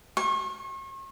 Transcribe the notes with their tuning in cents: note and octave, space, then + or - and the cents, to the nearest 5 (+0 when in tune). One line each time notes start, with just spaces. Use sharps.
C#6 -40